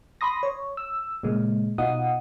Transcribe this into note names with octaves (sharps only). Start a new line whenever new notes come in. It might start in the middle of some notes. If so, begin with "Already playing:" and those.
B5 C6 D#6 A#6
C#5
E6
A#2 C#3 G#3
B2 D#4 F4 F#5 D#6